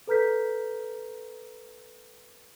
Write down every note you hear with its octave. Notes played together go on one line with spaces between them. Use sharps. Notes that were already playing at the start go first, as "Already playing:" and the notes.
A4 B4 A#5 F6 G6 B6